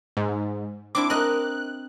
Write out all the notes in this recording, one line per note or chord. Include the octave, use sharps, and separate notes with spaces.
G#2
C4 D4 E4 D6
A#4 D#5 F#6